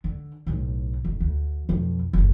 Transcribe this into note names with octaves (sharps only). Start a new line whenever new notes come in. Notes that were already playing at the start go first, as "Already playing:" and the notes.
D3
B1 A2
F1
D2
B1 F2
F#1 D2